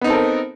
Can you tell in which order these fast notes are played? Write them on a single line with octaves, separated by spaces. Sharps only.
B3 D#4 C4 A4 A#4